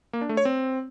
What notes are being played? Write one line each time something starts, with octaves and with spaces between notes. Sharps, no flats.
A#3
D4
A3
C#5
C4